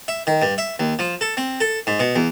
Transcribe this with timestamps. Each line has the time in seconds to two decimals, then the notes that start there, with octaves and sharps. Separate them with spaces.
0.08 E5
0.27 D#3
0.42 G2
0.58 E5
0.79 D#2
0.99 F3
1.21 A4
1.37 C4
1.60 A4
1.87 G#2
2.00 B2
2.16 E2